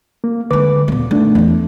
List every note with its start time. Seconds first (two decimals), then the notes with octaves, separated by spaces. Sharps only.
0.24 A#3
0.50 D3 D#3 G#3 B4 D6
0.88 D#2 A#2 A3 B3
1.11 D#3 A3 D4
1.35 E2 F4